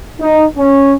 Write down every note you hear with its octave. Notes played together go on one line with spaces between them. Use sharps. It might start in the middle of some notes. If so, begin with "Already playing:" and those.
D#4
C#4